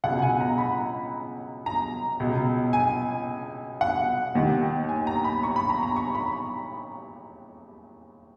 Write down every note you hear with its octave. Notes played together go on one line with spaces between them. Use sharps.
C#2 B2 F#5
G#5
A#5
B5
A#5
C#2 B2
G#5
F#5
D#2 D#3
G#5
A#5
B5
C#6
B5
A#5
A#5
C#6
B5